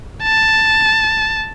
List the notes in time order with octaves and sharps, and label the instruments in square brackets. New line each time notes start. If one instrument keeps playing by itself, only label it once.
[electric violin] A5